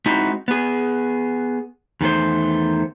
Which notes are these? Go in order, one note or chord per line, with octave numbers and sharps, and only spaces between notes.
G#3 C4 D#4 E4 F#4
B3 G#4
E2 D#3 A3 C5